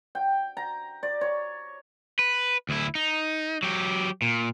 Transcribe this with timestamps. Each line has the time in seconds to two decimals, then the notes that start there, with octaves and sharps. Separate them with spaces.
0.15 G5
0.57 A#5
1.03 D5
1.21 C#5
2.19 B4
2.69 D2 E4
2.95 D#4
3.63 F#3 G4
4.22 A#2